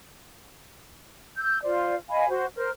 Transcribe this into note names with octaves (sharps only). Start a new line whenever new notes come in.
E6 G6
F4 C5 D5
D#5 F5 G#5 B5
F#4 C5
A#4 C5 F6